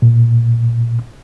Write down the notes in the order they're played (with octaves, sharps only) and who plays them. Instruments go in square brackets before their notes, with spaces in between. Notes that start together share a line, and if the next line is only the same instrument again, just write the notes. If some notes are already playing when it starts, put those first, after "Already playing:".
[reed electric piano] A#2